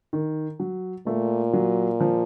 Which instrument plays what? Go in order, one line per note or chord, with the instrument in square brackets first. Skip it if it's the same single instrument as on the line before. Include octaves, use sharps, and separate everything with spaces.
[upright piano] D#3
F#3
[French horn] A#2 [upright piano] A3
[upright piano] F#3
F3